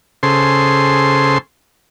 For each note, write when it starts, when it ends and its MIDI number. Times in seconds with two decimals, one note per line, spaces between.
0.23 1.38 49
0.23 1.38 68
0.23 1.38 69
0.23 1.38 72
0.23 1.38 84